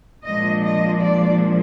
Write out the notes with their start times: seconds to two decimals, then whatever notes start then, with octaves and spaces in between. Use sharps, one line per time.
0.25 A#2 F3 G#3 D4 D#5
0.63 D#5
1.01 D5